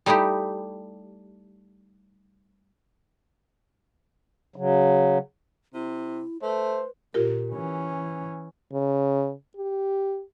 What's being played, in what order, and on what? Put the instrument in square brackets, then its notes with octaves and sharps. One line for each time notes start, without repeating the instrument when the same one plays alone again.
[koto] G3 A3 D#4 E4 G4
[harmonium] C#3 F#3
[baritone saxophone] C3 [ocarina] E4
[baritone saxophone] A3 [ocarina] B4 [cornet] C5
[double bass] A#2 [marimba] F4 G4 A#4
[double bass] E3 C#4
[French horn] C#3
G4